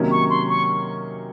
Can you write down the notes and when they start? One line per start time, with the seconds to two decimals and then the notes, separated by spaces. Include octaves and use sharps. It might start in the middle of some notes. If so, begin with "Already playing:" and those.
Already playing: C3 D#3 F#3 A#3 C#4
0.11 C#6
0.30 C6
0.49 C#6